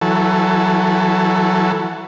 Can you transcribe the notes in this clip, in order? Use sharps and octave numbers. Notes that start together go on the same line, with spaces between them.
E3 F#3 A4